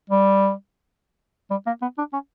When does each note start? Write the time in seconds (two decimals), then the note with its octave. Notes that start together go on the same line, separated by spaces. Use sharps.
0.10 G3
1.51 G3
1.67 A#3
1.82 B3
1.98 D4
2.13 C#4